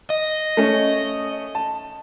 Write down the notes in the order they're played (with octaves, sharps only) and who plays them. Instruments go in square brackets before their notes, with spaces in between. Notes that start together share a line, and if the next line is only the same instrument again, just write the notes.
[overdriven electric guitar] D#5
[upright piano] A3 C#4
A5